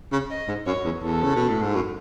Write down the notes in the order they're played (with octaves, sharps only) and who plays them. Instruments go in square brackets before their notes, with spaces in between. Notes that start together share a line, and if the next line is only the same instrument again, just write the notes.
[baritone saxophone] C#3
[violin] D#5
[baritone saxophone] G#2
[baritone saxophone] F#2 [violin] C#5
[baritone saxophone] E2
[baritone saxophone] E2 [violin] A4
[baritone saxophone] C#3
B2
A2
G#2
F#2